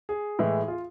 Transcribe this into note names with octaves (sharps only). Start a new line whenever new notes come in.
G#4
A2 E3 G#3
F4